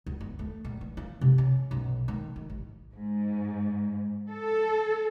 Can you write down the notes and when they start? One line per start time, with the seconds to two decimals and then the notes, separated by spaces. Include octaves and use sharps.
0.07 D2
0.21 B3
0.39 A3
0.65 A#1
0.81 E3
0.97 F4
1.21 C3
1.38 C#4
1.71 B1
2.08 D#3
2.36 D#3
2.50 A1
2.94 G#2
4.29 A4